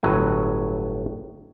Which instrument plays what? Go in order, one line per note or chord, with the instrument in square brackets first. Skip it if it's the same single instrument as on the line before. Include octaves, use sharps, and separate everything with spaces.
[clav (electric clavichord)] G1 A2 F#3 G#5